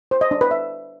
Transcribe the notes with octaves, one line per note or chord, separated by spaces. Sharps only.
C5
D#5
D4
B4
E5